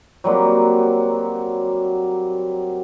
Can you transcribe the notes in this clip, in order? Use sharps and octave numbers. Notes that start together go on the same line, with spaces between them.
F#3 G3 A#3 C4